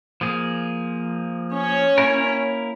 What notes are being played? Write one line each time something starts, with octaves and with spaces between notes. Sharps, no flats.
F3 A#3 G#4
C#4 C#5
A#3 E4 A#4